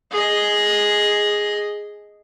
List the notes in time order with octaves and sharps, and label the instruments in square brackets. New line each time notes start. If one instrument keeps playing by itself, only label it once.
[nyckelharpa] G#4 D#5